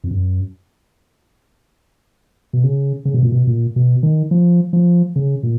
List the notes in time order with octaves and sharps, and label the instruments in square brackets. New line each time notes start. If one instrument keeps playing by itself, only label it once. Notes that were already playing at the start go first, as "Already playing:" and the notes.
[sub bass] F2
F#2
B2
C#3
C#3
B2
A#2
B2
A#2
B2
D#3
F3
F3
C#3
A#2